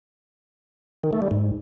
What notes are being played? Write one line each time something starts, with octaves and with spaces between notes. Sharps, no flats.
D#3
A3
G3
G#2